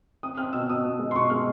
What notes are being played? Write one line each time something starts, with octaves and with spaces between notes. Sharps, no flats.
C4 D#6
C4 F6
B2 E6
B2 D#6
B2
G#3
C6
B2 C#6
G#3 F6